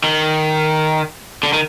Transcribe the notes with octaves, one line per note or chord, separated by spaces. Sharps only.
D#3
D3
D#3